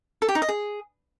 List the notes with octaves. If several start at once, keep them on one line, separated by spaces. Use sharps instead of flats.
A4
G4
D#4
D#5
G#4